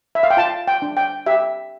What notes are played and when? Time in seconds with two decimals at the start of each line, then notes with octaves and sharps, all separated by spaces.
0.15 E5
0.23 F5
0.30 G5
0.37 F4 A5
0.68 G5
0.82 D4
0.97 G5
1.26 G4 E5